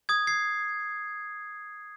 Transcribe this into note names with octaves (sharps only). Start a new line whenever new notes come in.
D#6 G#6
G#6 C7